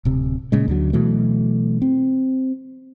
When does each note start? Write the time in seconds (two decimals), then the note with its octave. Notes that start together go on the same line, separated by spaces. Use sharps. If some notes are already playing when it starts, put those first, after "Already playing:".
0.05 D1 C3
0.52 A#2 C#3 G#3
0.68 D2 D3 F#3
0.93 B2 E3 F#3 A3
1.82 C4